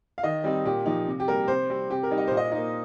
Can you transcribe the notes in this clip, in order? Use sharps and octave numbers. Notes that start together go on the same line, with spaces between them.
F5
D#3 D#5
G3 C4 D#4
A#2 G4
F3 D#4
C3
G4
G3 A#3 A#4
C3 C5
G3 C4
C3 G4
A#4
G3 D#4
D#5
A#2 C5
D#5
A#3 D#4